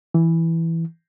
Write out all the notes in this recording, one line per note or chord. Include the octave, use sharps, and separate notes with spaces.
E3